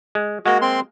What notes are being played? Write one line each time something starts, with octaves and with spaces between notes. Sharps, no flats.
G#3
G#3 A#3 F#4
C4 C6